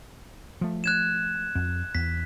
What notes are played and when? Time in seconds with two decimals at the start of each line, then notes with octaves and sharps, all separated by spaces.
0.61 F3 A3
0.84 F#6 G#6 E7
1.55 F2
1.95 E2 B6